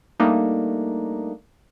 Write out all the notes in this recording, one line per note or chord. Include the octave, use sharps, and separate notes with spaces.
G3 A3 A#3 D4 D#4